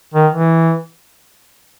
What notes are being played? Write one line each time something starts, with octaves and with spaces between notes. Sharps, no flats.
D#3
E3